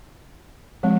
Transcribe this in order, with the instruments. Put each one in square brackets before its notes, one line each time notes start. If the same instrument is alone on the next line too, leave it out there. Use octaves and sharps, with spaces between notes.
[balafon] F3 G#3 C4